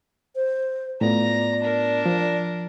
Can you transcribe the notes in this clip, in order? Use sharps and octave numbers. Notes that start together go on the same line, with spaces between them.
C5
A2 B3 F4 D5 A#5
D4 A#4
F3